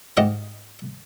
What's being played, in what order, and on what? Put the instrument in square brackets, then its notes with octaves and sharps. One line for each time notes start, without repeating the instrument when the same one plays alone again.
[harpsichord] G#2 G4 D#5 F5 F#5